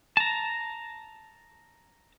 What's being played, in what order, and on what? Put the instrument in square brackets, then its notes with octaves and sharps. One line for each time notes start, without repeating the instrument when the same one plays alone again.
[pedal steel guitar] A5 A#5